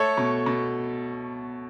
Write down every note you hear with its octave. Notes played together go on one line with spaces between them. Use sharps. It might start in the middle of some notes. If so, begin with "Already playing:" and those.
Already playing: A3 A4 C#5
B2
B2